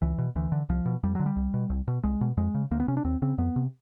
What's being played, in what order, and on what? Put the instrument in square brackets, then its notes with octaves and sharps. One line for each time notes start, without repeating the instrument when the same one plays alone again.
[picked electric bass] C#2 E3
B2
D2 E3
D3
C2 F3
B2
F2 G3
D3 F#3
G3
C2
B2
C2
B2
C2 G#3
B2
F2 G#3
C#3
D2 A#3
B3
C3 C#4
D4
D#2 C4
C#3 C4
F2 B3
C3